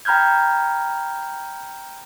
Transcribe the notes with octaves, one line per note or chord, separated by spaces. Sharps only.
G5 A#5 B5 F6 G6 G#6